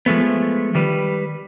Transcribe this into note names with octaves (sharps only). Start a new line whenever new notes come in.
F3 G#3 A3 B3
D#3 G3 B4